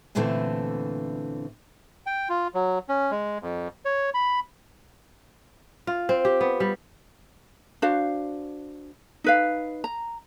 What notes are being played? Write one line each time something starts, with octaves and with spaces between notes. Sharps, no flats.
E2 A#2 D3 E3 A3 C4
G5
F4
F#3
C#4
G#3
F2
C#5
B5
F4
C4
G4
B3
G3
D4 F#4 C5 F5
D#4 B4 F5
A#5